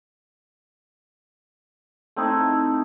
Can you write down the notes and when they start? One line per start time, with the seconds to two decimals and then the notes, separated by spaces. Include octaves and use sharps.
2.16 A3 C4 D#4 E4